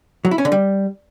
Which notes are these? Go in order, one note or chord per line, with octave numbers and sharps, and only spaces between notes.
F#3
E4
C#4
D3
G3